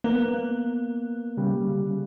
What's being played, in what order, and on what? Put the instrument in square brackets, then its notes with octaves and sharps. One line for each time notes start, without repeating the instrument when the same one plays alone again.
[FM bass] A#3 [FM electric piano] B3
[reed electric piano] C#3 G3